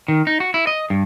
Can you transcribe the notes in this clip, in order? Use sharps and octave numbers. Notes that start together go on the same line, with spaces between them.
D#3
D#4
F#4
E4
D#5
G2